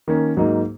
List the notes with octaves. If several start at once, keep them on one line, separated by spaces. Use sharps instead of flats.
D#3 A#3 C#4
G#2 F#3 A#3 D#4